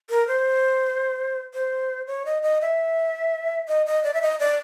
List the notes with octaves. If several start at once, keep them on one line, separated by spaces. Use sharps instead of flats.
A#4
C5
C5
C#5
D#5
D#5
E5
D#5
D#5
D5
E5
D#5
D5